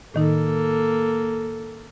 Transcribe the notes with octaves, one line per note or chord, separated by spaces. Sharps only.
A2 D#3 A#3 D#4 A4